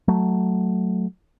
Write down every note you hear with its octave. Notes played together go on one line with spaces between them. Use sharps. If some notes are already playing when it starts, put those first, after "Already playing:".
F#3 A3